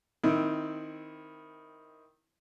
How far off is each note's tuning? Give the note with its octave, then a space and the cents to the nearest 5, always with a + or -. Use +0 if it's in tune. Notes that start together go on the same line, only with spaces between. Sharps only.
D#3 +5 C4 +0 E4 -10